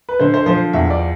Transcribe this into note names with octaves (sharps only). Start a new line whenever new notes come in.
B4
D3 C5
C5
F3 C5
E2 E5
D5